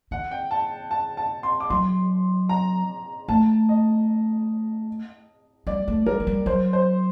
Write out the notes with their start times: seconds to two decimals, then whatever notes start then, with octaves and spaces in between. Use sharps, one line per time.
0.11 D#3 F#5
0.31 G5
0.51 A5
0.91 A5
1.17 A5
1.43 C6
1.60 D6
1.70 F#3 C6
2.49 A#5
3.28 A3 A5
3.69 D#5
5.67 G3 D5
5.88 A3
6.06 G3 A#4
6.20 F#3
6.27 G3
6.46 F#3 C5
6.73 C5